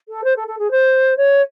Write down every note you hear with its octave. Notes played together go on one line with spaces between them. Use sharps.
A4
C5
A4
A4
G#4
C5
C#5